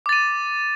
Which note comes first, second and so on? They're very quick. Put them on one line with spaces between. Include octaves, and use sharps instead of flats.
D6 A6 D#7